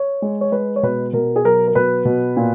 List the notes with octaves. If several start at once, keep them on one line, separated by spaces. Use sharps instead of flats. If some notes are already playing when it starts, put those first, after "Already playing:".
Already playing: C#5
G#3
C#5
G#3 B4
C#5
B2 B4
B2 A#4
G#4
F#3 A#4
A#4
B2 B4
B2
A#2